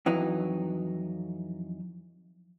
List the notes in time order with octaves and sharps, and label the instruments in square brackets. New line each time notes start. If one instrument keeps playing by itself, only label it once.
[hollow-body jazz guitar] F2 E3 F#3 D#4